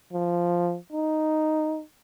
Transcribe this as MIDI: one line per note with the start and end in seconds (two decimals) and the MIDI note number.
0.13 0.77 53
0.93 1.82 63